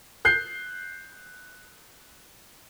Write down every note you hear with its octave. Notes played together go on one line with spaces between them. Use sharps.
F#6 G6 C7